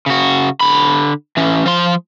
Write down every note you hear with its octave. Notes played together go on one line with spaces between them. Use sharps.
C#3 F#4
D3 B5
E3 C#4
F3 C6